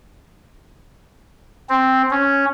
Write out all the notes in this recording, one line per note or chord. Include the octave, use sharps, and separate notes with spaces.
C4
C#4